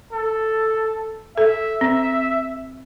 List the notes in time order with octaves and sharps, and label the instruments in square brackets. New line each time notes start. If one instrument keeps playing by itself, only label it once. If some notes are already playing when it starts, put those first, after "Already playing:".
[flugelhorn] A4
[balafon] A4 [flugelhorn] E5
[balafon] C4